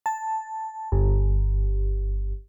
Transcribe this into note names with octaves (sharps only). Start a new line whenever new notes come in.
A5
G1